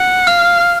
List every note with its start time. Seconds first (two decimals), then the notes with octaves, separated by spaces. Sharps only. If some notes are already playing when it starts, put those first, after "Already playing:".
Already playing: F#5
0.27 F5 F6